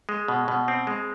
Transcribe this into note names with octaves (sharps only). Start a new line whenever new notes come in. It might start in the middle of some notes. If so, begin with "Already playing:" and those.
G#3
B2
B2
C4
G#3